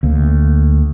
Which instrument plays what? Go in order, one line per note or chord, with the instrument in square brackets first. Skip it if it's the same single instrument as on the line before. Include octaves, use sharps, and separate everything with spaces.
[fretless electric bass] D2 A#3